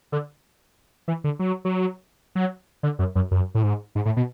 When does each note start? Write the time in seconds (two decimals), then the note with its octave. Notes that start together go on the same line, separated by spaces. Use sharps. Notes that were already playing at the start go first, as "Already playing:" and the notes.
0.12 D3
1.08 E3
1.24 D3
1.39 F#3
1.65 F#3
2.35 F#3
2.83 D3
2.99 F#2
3.15 F#2
3.31 F#2
3.55 A2
3.64 G#2
3.95 G#2
4.05 A2
4.17 B2